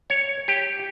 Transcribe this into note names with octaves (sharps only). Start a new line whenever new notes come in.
C#5
G4